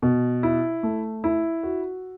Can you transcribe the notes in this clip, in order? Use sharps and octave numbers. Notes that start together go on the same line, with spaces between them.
B2
E4
A3
E4
F#4